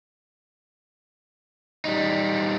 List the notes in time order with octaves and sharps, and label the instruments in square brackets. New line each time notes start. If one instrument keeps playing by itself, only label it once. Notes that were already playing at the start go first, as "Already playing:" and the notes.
[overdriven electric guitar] G3 D#4